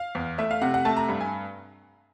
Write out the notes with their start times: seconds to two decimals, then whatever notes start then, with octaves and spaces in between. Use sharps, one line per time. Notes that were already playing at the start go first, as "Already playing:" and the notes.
Already playing: F5
0.15 E2
0.38 A3 E5
0.51 F5
0.62 C3 F#5
0.74 F#5
0.85 A3 A5
0.96 A#5
1.08 G2
1.21 G#5